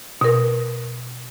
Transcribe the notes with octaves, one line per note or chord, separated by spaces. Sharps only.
B2 A#4